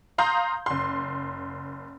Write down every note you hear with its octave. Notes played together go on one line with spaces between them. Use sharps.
F5 A#5 C6 D#6 G6
F#1 C6